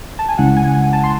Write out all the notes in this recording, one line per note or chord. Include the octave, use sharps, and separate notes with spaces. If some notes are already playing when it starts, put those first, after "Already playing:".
A5
G#5
C#2 C#3 G#3 C#4 E4 F#5
G#5
G#5
A5
C6